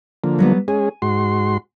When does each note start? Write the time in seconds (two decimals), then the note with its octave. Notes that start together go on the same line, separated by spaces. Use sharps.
0.24 D3 F3 A#3
0.39 F#3 G3 B3
0.68 G#3 C#4 G#4 G#5
1.02 G#2 F#4 C6